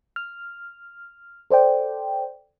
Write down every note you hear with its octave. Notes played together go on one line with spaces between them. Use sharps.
F6
A4 C5 D5 G5